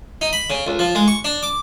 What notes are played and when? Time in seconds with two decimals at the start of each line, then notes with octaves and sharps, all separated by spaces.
0.21 D#4
0.33 B5
0.50 C#3
0.67 C#2
0.79 F3
0.95 G#3
1.08 C#6
1.25 D4
1.43 D6